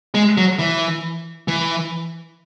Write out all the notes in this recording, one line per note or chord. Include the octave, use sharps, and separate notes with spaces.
G#3
F#3
E3
E3